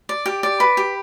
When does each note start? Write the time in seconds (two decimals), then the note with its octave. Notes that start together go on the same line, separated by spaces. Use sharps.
0.09 D5
0.26 G4
0.43 D5
0.60 B4
0.77 G4